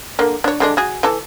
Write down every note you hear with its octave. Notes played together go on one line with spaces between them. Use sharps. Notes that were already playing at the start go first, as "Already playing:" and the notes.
D3 A#3
D4 C#5
D3 G#3 D4
F#4 G#4
E3 A4